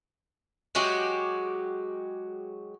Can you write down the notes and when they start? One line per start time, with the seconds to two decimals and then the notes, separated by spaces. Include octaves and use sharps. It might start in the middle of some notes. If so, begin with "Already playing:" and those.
0.75 F#3 G#3 F#4 G4